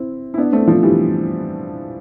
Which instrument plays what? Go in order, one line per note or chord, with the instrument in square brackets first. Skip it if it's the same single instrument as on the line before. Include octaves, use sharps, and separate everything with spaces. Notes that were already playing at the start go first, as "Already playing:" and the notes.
Already playing: [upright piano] C4 E4
E4
B3 D4
A3 C4
F3
E3 G3